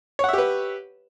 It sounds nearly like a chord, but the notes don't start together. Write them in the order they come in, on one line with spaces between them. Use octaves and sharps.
C#5 F#5 E5 G4 B4